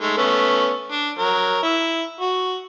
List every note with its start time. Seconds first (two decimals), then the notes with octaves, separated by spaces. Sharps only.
0.01 G#3 A3 D#4
0.17 A3 B3 C#4
0.91 D4
1.18 F#3 A#4
1.63 E4
2.20 F#4